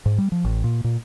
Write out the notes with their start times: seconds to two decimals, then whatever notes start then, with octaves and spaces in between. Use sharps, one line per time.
0.06 G#2
0.18 G3
0.32 F3
0.45 A1
0.64 A#2
0.84 A#2